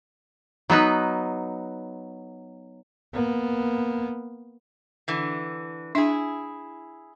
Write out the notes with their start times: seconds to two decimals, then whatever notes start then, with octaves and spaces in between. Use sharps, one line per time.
0.70 F#3 B3 D#4 B4
3.14 A#3 B3
5.08 D3 E3
5.95 D4 E4 G#4